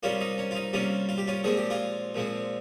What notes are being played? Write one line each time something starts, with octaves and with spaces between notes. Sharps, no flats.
C3 G3 A#3 C#4 F4
D#4
C#4
F4
D#4
C3 G3 A#3 C#4 F4
F4
G4
C#4 F4
A#2 F3 G#3 C4 G#4
G4
F4 G#4
A#2 F3 G#3 C4